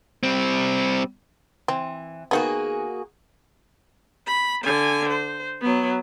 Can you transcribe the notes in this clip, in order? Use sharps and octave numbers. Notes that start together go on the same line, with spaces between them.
G3 C4
E3 C4
D#3 A#3 B3 F#4 G#4
B5
D3 G#5
C5
F#3 B3